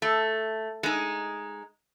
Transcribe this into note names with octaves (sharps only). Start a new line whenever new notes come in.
A3
G#3 D#4